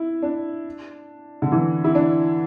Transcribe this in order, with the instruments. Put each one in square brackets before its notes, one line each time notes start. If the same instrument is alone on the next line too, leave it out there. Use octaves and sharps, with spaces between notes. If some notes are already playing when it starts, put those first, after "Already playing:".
Already playing: [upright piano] E4
D4
D3
E3
E4
D4